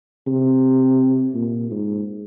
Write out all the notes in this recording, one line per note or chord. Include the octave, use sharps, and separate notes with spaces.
C3
A#2
G#2